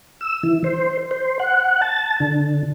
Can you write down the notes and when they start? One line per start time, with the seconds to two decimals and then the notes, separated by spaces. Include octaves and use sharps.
0.21 E6
0.43 E3
0.64 C5
1.11 C5
1.40 F#5
1.82 A5
2.20 D3